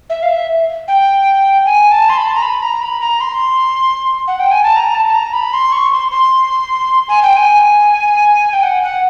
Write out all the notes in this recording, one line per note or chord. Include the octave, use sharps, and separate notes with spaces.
E5
F5
E5
G5
G#5
A5
C6
B5
A5
A#5
B5
A#5
B5
A#5
C6
F#5
G5
G#5
A5
A#5
A5
A5
A#5
B5
C6
C#6
C6
C6
G#5
G5
G#5
G5
F#5
F#5